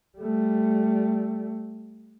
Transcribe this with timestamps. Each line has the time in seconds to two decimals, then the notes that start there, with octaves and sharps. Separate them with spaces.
0.18 G3 A3